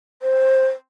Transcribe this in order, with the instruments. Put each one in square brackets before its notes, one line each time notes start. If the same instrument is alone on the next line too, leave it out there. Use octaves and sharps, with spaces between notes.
[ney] C5